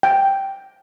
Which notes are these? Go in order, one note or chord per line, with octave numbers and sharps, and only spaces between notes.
G5